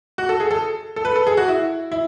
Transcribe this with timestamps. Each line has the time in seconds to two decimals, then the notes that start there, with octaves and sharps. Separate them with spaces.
0.18 F#4
0.29 A4
0.40 G#4
0.51 A4
0.96 A4
1.05 B4
1.16 A4
1.27 G#4
1.37 F#4
1.48 E4
1.92 E4